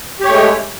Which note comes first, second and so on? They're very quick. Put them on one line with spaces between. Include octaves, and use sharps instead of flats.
G4 C#5 A3 G#3